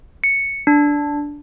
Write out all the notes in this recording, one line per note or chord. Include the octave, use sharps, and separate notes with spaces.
C#7
D4